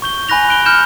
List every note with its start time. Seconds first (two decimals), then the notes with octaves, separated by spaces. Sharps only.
0.02 C#6 G6 G7
0.29 G#5 B5 F#6 A#6 F7
0.48 B5 F#6 D7 G7
0.66 F6 G6 C#7 E7